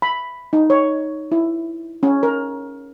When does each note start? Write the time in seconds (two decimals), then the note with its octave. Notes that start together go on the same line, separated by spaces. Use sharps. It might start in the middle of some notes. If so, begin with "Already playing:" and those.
0.02 B5
0.53 D#4
0.70 C#5
1.32 E4
2.03 C#4
2.23 A#4